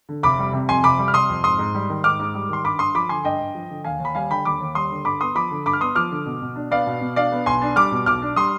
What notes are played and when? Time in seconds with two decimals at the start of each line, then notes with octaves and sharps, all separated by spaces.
0.09 D3
0.23 F1 B5 D6
0.39 G3
0.53 C3
0.69 F2 G#5 C6
0.84 F1 B5 D6
0.99 G3
1.08 F6
1.14 C3 C6 D#6
1.29 F2
1.44 G#2 C6 D#6
1.59 G#2
1.75 G3
1.89 D#3
2.04 G#2 D6 F6
2.19 G#2
2.35 G3
2.49 D#3 C6
2.65 G2 B5 D6
2.79 G2 C6 D#6
2.95 F3 B5 D6
3.09 D3 G#5 C6
3.24 G2 D#5 G5
3.40 G2
3.55 F3
3.70 D3
3.84 D#2 F5 G#5
4.00 D#2
4.05 B5
4.15 G3 F5 G#5
4.30 D3 G5 B5
4.45 D#2 B5 D6
4.60 D#2
4.75 G3 C6 D#6
4.91 D3
5.05 G2 B5 D6
5.21 B3 C6 D#6
5.35 F3 B5 D6
5.51 D3
5.66 G2 B5 D6
5.73 F6
5.80 B3 C6 D#6
5.95 F3 D6 F6
6.11 D3
6.26 B2
6.42 B2
6.56 D4
6.71 B3 D5 F5
6.86 B2
7.01 B2
7.16 D4 D5 F5
7.32 B3
7.46 B1 G#5 C6
7.62 D4
7.76 G3 D6 F6
7.92 B2
8.06 B1 D6 F6
8.22 D4
8.36 G3 C6 D#6